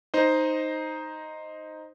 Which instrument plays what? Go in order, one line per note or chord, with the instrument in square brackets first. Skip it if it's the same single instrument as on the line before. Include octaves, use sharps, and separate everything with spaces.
[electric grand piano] D#4 C5 D#5